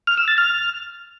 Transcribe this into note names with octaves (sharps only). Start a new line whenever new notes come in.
F6
E6
A6
F6